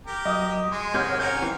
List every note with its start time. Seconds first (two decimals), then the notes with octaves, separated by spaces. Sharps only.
0.07 G4 A#4
0.25 F#3 D#5 D#6
0.72 G#3 C6
0.94 G#2 C3 D#3 C#5 F#5 F6 G6 G#6
1.19 C#4 A#4 G6
1.42 E3 C4